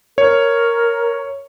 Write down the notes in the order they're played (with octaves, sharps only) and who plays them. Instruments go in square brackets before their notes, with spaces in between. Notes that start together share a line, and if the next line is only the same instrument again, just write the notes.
[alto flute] A#4 [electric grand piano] C#5